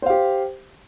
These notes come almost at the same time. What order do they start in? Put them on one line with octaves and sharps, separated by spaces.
C5 F5 G4